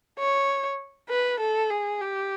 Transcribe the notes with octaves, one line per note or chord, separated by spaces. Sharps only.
C#5
B4
A4
G#4
G4